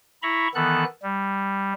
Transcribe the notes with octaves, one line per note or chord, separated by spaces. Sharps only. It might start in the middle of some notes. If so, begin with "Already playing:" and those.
E4 A#5 B5 C#6
D#3 E3 B3 A4 F#6
G3